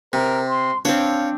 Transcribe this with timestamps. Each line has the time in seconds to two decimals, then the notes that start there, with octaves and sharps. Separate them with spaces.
0.13 C3 A#4
0.46 C6
0.85 C4 D4 C#5 F5